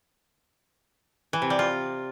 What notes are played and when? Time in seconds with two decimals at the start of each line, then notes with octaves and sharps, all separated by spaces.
1.33 E3
1.42 C3
1.50 G3
1.59 F4